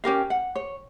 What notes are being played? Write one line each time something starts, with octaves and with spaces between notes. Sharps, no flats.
C#4 G4 A#4 F5
F#5
C#5